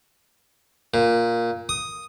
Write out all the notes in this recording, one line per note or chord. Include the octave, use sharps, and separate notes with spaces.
A#2
D#6